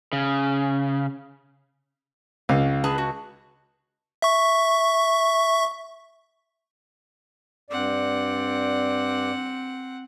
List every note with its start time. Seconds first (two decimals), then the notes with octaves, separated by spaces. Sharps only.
0.13 C#3
2.49 C#2 F5
2.84 G#4 B4 A5
2.98 F#4
4.22 E5 C#6
7.70 G2 C4 D5 F#5